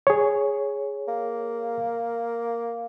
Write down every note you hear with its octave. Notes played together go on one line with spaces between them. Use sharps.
G#4 C#5
A#3